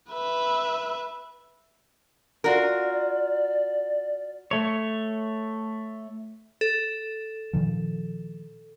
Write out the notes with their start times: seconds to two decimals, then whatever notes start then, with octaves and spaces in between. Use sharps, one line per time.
0.12 B4 E5
2.44 F4 F#4 A#4 D5
4.51 A3 C#5
6.61 A4
7.53 A#2 D#3 F3